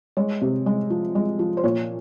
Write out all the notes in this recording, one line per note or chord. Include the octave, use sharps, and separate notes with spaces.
G#3 C#5
C3
G#3
F3
G#3
F3
C5
A#2 C#5